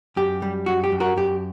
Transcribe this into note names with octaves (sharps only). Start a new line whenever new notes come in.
F#2 G4
G3
F#2 F#4
G4
F#2
F#4 A#4
F#2 G4